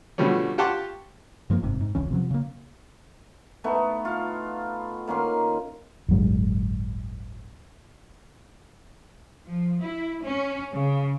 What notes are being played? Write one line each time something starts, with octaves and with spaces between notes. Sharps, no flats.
B2 D3 F3 G3 A3 C#4
F4 G4 F#5 A5 C6 C#6
G2 F3 G#3 A#3
F#1 G#2 C3
G#2
E1 C#2 E3 C#4
C3 F3 F#3
C#3 A#3
A3 B3 D#4
F4 F5
D#3 A#3 C#4 C6
D1 G1 F#3 G#3
F3
E4
C#4
C#3